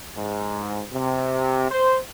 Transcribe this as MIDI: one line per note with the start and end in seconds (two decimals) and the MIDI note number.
0.16 0.84 44
0.93 1.66 48
1.70 1.97 72